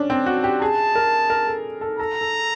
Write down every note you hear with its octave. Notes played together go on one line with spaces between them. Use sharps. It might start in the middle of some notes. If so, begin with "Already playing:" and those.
Already playing: C#4 D4
C4
F#4
G4
G#4 A5
A#4
A#4
A4
A4
A4 A#5
A4